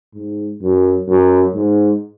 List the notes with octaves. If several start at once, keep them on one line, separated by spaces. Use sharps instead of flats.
G#2
F#2
F#2
G#2